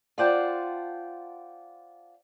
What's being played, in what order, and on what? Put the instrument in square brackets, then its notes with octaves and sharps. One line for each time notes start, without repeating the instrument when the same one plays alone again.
[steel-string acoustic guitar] F4 C5 D5 F#5 G5 A5